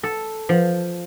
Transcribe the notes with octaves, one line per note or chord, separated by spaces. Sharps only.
A4
F3